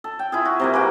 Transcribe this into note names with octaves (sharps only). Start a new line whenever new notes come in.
A4
G5
E4 F4 G#4
F#4
C3 G3 A#3
E3 A#3 F#4